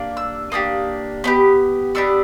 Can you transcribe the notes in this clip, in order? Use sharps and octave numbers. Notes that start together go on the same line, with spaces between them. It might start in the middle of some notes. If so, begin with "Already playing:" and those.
Already playing: A#3 D4 G4
E6
A#3 D4 G4 D#6
B3 D4 G4
B3 D4 G4 E6